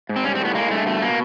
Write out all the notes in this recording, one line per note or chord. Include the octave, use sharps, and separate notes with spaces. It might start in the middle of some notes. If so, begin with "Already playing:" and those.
G#2
C4
G3 C#4
C4
A2 B3
G#3 A#3
G2 A3
B2 A3
B2 A#3